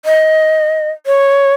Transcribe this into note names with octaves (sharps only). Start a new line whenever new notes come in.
D#5
C#5